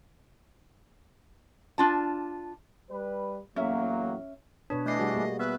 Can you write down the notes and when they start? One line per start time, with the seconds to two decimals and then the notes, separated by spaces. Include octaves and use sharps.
1.78 D4 F4 A5
2.90 G3 B4
3.56 E2 A2 F#3 A#3 C#4 E5
4.70 B2 D4 B4 C#5
4.86 E3 A3 D4 D#5 C7
4.99 G3 F#4 G#4
5.15 G3 A#3 G#4
5.39 B3 B4 E5 F#6